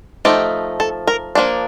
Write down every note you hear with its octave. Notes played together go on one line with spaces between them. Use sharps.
F3 A3 D#4 G4
A4
A#4
F3 A#3 D4